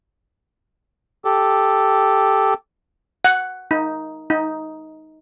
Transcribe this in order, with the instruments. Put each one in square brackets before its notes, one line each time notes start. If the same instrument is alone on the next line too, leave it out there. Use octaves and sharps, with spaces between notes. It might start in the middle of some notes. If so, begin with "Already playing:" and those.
[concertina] G4 A4
[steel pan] F#5
D#4
D#4